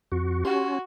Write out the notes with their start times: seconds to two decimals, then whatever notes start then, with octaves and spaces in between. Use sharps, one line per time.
0.12 F2 F#4
0.45 C#4 F#4 G4 C6